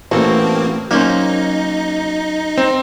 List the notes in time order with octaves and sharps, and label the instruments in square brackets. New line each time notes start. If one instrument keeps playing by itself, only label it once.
[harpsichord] A1 [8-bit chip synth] A#3 C4 [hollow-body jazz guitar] F#4 A4
[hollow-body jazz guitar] F#3 C#4 C5 [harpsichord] A#3 [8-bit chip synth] D#4
[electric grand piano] C4